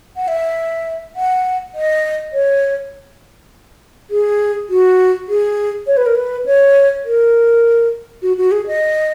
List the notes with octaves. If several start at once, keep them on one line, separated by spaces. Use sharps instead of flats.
F#5
E5
F#5
D#5
C#5
G#4
F#4
G#4
C#5
B4
A#4
B4
C#5
A#4
F#4
F#4
G#4
D#5